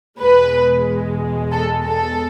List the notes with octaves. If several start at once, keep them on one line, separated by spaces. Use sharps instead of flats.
E2 B2 G#3 B4
A4
A4